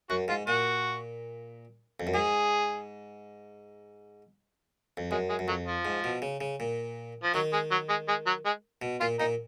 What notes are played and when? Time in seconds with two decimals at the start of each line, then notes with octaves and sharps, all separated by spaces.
0.09 F#2 F#4
0.28 G#2 F4
0.47 A#2 F#4
2.00 F2
2.07 F#2
2.14 G#2 G#4
4.97 F2
5.11 F#2 G#3
5.29 G#3
5.39 F#2
5.48 F2 F#3
5.66 F3
5.85 G#2
6.04 B2
6.22 C#3
6.41 C#3
6.60 A#2
7.23 F3
7.34 D#3 F#3
7.53 G#3
7.71 F#3
7.89 G#3
8.08 G#3
8.27 F#3
8.45 G#3
8.82 B2
9.00 A#2 F4
9.19 A#2 D#4